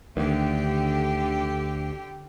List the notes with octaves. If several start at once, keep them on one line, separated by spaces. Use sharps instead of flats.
D2 D3 D#3 G4